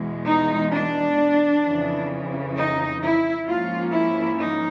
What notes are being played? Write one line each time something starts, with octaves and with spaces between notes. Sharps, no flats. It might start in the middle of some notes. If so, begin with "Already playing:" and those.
Already playing: E2 B2 G#3
D#4
D4
F2 C#3 E3
D#4
E4
G#2 F3 A#3 C#4 F4
E4
D#4